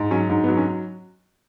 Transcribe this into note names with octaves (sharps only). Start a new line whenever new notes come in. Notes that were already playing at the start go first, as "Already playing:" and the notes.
Already playing: G#2
F#3 C#4
G#2
B3
F#3
C#4